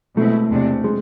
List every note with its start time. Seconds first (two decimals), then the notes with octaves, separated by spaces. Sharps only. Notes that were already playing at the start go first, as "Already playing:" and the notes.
0.17 B2 G#3 A3 C4 E4
0.51 E2 C3 G#3 D4
0.84 G#3